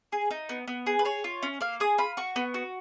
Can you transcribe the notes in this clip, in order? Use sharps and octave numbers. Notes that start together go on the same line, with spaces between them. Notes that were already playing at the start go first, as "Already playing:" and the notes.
G#4
D#4
B3
B3
G#4
B4
G#4 C#5
F4
C#4
A#3 F5
G#4 D#6
F4 B5
F#4 C#6
B3
F#4